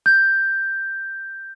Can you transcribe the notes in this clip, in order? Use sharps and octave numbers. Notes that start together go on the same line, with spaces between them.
G6